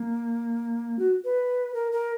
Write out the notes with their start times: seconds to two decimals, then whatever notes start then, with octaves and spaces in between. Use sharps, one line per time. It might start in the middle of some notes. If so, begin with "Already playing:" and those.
Already playing: A#3
0.99 F#4
1.25 B4
1.74 A#4
1.92 A#4